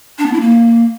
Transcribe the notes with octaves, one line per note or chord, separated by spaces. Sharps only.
D4
B3
E4
A#3